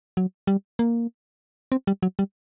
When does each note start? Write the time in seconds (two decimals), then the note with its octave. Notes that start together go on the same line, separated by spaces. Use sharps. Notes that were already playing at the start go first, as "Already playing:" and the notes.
0.17 F#3
0.47 G3
0.79 A#3
1.72 C4
1.87 G3
2.03 F#3
2.19 G3